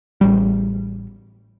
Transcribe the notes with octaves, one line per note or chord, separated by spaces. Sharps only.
A1 G3